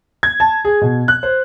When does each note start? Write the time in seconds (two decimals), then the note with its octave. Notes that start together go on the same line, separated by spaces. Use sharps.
0.23 G#6
0.40 A5
0.65 G#4
0.82 B2
1.08 F#6
1.23 C5